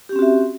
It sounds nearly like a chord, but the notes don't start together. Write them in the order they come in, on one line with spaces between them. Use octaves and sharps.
G4 C#4 C4 F#4 E5